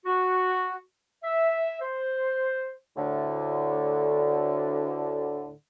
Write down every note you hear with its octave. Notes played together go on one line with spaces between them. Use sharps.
F#4
E5
C5
D2 A2 D3